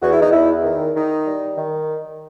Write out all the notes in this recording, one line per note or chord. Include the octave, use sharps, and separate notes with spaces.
E2 F#4
E4
D#4
E2 E4
D#3
D#3 D#4
G3
D#3